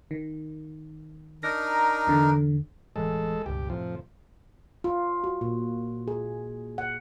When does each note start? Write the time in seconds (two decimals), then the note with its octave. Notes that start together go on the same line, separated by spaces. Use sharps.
0.11 D#3
1.43 D4 D#4 A#4 A#6
2.07 E2 D3
2.96 E1 A2 E3 G#3 A4
3.46 C#2 G2 B2 G4
3.70 F2 A2 C3 F3
4.84 F4
5.24 F#4
5.41 A#2
6.08 G#4
6.78 F#5